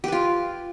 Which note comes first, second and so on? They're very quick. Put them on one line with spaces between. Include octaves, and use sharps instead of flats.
G4 B4 F4